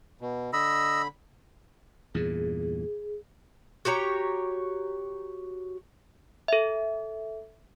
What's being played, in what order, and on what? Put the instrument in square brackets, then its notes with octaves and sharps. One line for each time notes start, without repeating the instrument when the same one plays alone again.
[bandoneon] B2
[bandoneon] D3 B5 [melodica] D#5 E6
[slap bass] E2 G2 A#2 [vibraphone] G#4
[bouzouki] F#4 G4 C#5 A#5
[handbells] A4 E5